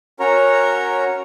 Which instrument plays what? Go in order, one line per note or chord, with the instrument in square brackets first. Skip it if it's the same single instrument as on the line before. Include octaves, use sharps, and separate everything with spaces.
[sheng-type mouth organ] C#4 F#4 A#4 C#5 A#5